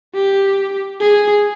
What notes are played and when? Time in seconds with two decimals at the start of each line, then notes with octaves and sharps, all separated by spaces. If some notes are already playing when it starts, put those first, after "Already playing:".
0.14 G4
1.00 G#4